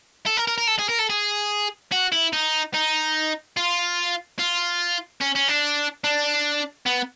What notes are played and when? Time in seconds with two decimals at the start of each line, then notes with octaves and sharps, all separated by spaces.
0.26 A4
0.37 A#4
0.47 A#4
0.58 A#4
0.67 A4
0.79 G#4
0.89 A#4
0.99 A4
1.10 G#4
1.92 F#4
2.12 E4
2.33 D#4
2.74 D#4
3.57 F4
4.39 F4
5.21 C#4
5.35 C#4
5.48 D4
6.04 D4
6.86 B3